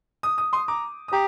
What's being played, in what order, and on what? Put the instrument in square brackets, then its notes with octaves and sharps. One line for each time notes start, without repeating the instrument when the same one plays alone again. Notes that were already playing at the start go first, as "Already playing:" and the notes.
[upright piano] D#6
D#6
C6 D#6
A#5 D6
D#6
[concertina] G4 [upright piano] A#5